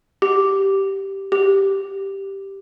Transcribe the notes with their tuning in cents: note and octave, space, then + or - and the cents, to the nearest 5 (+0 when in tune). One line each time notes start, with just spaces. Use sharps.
G4 -5
G4 +0